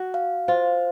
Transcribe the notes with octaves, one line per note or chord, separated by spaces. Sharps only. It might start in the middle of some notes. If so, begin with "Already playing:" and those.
Already playing: F#4
F5
F4 C5